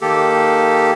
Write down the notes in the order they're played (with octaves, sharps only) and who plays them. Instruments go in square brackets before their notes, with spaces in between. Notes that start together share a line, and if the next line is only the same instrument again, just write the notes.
[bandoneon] D#3 A#3 G4 A4